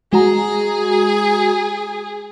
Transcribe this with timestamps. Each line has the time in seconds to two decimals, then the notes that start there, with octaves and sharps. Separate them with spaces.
0.13 G#3 F#4 G#4 A#5